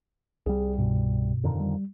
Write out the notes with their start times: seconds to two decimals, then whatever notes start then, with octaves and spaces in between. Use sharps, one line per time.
0.46 C2 G3 G#4
0.78 G2 B2
1.44 F2 D3 D#3
1.60 G3